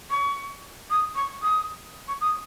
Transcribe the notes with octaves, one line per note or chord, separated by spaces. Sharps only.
C#6
D#6
C#6
D#6
C#6
D#6